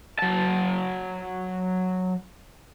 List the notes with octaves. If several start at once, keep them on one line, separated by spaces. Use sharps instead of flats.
F#3 A5